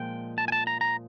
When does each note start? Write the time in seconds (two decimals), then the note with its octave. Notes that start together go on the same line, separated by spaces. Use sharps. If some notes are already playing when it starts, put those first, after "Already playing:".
Already playing: A#2 F3 G#3 G5
0.38 A5
0.48 G#5
0.52 A5
0.67 A#5
0.81 A#5